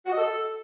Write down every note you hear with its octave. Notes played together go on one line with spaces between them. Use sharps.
F#4
D#5
A4